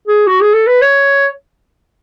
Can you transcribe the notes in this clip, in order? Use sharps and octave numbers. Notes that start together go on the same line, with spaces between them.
G#4
F#4
G#4
A4
B4
C#5